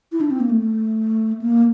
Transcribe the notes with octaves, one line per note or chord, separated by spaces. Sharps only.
E4
D4
C4
A#3
A3
A#3